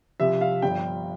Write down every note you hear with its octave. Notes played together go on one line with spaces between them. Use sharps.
C2 C3 F3 E5
F5
G1 G2 F3 G5